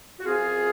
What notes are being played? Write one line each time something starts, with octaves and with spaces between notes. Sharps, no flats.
F#4
F#2 F3 C4 F4 G#4